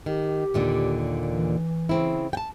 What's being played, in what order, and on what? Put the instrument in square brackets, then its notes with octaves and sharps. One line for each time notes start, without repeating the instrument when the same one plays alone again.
[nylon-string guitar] D#3 [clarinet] G4
[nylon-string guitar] D#2 A#2 D3
[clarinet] E3
[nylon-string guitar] C#3 C4 E4
G5 A5